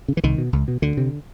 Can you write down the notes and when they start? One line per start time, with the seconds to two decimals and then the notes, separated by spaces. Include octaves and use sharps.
0.08 C#3
0.17 E3
0.24 C2 D#3
0.38 B2
0.53 C#2
0.68 B2
0.82 D2 D3
0.97 C3